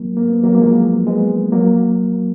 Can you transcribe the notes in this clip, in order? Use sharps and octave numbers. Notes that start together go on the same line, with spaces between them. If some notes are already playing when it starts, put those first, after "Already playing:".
Already playing: F#3 A#3
A#3
B3
F#3 A#3
A#3
F3 G#3
G#3 B3
F#3 A#3